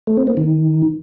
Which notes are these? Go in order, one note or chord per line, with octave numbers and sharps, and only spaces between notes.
A3
C4
A#3
D#3